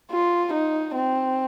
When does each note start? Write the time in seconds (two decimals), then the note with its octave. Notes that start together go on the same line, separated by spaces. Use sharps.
0.11 F4
0.53 D#4
0.95 C4